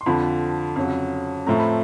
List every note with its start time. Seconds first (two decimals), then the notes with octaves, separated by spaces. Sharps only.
0.01 C6
0.06 F2 D3 F3 B5
0.76 F2 C#3 F#3
1.46 A2 F3 A3 C4 A#5
1.59 B5